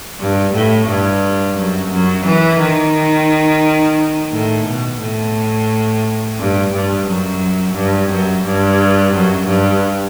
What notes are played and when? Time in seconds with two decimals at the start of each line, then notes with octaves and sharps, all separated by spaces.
0.20 G2
0.54 A2
0.88 G2
1.57 F#2
1.92 F#2
2.26 E3
2.60 D#3
4.32 A2
4.67 B2
5.01 A2
6.39 G2
6.73 G2
7.07 F#2
7.75 G2
8.11 F#2
8.45 G2
9.14 F#2
9.48 G2